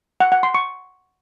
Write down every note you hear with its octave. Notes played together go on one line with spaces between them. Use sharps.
F#5
F#5
C6
C#6